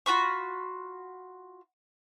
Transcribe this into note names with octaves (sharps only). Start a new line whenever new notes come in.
F4 F#4 B5 C#6